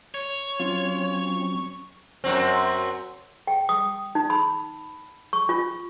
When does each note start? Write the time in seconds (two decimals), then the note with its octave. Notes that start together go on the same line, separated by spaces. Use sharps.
0.14 C#5
0.60 F#3 C4 C#4 F4
2.24 F#2 F#3 C4
3.47 G5
3.69 D#6
4.15 D#4
4.30 B5
5.33 C#6
5.49 F4